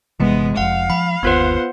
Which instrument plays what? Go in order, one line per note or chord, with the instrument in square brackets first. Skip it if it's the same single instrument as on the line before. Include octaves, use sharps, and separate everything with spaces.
[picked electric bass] G1 C3 E3 [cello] G#3 B3
[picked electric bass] F1 F2 [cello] F5 [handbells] F#5
[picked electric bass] F3 [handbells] B5
[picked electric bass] G1 D#2 [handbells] B3 F4 B4 [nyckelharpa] C5 F#5